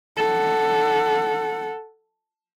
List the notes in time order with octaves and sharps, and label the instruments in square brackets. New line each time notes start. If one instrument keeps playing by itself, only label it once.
[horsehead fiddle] A4 F#5